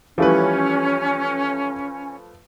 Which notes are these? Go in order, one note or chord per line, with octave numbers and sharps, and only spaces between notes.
E3 F3 G3 A3 C#4 B4